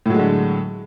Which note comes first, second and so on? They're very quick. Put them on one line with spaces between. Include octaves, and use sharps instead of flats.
A2 F#3 G#3 D3